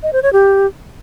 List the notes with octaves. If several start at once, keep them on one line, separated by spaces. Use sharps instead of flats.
D#5
C5
C#5
G4